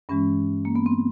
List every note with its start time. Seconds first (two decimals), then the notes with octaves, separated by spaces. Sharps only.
0.09 G2 E3 G#3 C#4
0.65 A#3
0.76 B3
0.86 C4